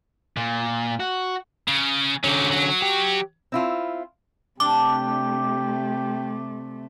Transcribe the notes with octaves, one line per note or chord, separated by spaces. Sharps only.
A#2
F#4
C#3
D3 F#3 C#4 G4
F#3
G4
C4 E4 F4
C3 A3 D4 G4 D6